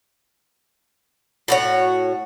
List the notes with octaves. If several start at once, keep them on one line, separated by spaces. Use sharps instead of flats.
A2 F#4 C#5